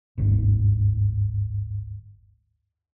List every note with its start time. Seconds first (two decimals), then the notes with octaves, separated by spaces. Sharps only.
0.18 G1 D2 G#2